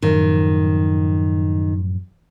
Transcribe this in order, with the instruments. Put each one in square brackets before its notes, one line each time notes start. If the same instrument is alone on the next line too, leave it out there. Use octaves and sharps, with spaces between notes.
[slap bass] F#2 A2 F3 [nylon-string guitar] D#3